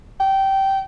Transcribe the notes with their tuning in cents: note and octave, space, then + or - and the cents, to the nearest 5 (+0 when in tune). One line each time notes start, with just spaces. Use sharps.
G5 -15